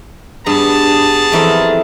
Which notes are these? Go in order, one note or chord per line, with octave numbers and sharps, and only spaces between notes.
G2 B3 G#4 A5
F2 E3 A#4